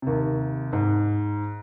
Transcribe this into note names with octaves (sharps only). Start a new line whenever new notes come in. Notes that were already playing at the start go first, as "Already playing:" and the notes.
D#2 C3
G#2